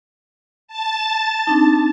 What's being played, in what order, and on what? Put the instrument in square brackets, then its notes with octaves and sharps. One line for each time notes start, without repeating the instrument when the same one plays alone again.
[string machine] A5 A6
[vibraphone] C4 D4 D#4